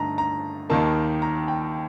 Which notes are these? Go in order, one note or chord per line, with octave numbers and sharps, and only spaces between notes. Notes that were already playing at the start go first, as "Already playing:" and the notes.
Already playing: G2 D3 A3 D#4 A#5
A#5
D#2 D#3 A#3 A5
A#5
G5